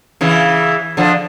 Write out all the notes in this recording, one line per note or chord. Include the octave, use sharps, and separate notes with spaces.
C#3 E3
D3 F3